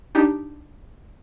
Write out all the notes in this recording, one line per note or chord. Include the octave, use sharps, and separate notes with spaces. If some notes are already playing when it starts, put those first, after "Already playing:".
D4 D#4 G4